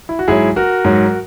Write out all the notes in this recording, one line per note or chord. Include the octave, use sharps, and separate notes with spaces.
E4
F#4
G#2 F#3 E4 G#4
F#4 A#4
G#2 F#3